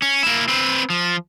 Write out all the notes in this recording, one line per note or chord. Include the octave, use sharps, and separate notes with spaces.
C#4
A#3 E4
C4 B4
F3